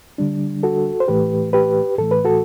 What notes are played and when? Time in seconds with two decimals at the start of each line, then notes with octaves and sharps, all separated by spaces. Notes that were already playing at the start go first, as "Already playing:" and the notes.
0.18 D3 G3 D4
0.63 F#4 A4
1.00 C5
1.08 A2 E3 A3 G4 B4
1.53 G4 B4
1.98 A2 E3 A3 A4
2.11 B4
2.25 F#4 A4